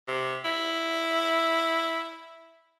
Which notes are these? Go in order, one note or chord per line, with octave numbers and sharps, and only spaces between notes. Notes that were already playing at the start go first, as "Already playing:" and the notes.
C3
E4